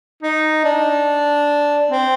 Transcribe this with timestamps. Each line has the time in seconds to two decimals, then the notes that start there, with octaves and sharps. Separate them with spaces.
0.23 D#4
0.64 D4
1.91 C4